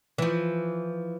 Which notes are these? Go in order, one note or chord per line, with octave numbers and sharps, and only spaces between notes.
E3 F3